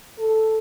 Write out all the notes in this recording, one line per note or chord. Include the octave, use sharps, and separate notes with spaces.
A4